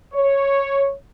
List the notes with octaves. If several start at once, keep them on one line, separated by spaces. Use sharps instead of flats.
C#5